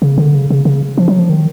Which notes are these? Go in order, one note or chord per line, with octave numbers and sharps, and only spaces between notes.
C#3
D3
C#3
C#3
C#3
F3
F#3
F3
D#3